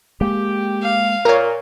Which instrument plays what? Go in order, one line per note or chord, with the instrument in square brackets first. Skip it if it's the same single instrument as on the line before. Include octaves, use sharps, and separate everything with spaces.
[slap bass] G#3 A#3 [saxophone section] G4
[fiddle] F5
[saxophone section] A#2 [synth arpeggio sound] A#4 C#5